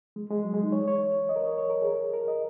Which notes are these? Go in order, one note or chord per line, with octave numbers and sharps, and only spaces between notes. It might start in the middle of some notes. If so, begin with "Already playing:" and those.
G#3
G#3
F#3
G#3
D#4
C#5
C#5
D#5
A#4
C#5
C#5
A#4
G#4
A#4
A#4
D#5